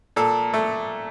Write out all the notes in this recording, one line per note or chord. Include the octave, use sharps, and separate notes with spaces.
A#2 A4
A3